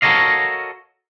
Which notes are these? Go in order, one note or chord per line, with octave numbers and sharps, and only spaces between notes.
F#4 A4 A#4 C#5 D#5 F5